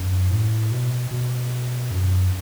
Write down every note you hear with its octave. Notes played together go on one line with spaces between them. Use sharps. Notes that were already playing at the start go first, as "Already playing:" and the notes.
Already playing: F#2
A2
B2
B2
F#2